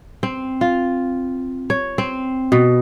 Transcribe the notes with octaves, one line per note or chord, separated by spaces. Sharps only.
C4
F4
C#5
C4
B2